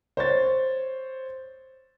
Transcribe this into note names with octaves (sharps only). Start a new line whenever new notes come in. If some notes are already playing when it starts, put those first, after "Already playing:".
C5 C#5 A6